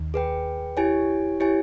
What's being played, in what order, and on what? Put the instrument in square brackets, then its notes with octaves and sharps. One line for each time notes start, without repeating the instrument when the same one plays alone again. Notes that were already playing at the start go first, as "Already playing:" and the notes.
Already playing: [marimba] D#2 D#3
[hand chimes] G#4 B4 G5
E4 G4 C#5 G#5
E4 G4 C#5 G#5